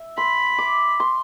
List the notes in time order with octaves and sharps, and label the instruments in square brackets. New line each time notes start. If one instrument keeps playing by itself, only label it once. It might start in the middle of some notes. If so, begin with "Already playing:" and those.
Already playing: [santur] E5
[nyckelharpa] B5 [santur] C6
[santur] D6
C6